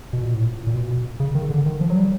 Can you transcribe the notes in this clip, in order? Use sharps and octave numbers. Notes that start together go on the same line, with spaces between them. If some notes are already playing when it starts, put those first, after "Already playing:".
B2
A#2
A2
A#2
A#2
B2
C#3
D#3
D3
D#3
F3
F#3
G3